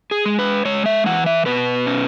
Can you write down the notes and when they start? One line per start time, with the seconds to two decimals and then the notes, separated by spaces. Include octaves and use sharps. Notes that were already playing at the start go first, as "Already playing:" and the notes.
0.11 G#4
0.25 G#3
0.39 B4
0.65 G#3 C#5
0.86 E5
1.06 E3 F#5
1.26 E5
1.46 B2 B4
1.86 C#4